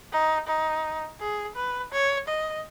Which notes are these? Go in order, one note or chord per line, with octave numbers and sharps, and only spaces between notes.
D#4
D#4
G#4
B4
C#5
D#5